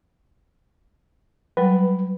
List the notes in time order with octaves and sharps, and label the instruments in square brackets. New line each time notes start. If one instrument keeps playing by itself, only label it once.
[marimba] F#3 G3 [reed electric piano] B4